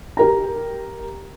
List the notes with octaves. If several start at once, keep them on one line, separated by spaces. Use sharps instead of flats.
G4 A#4 A#5